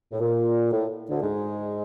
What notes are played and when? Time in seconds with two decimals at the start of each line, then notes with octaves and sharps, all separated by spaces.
0.12 A2
0.20 A#2
0.71 A2
1.09 D2 D3
1.22 G#2 G#3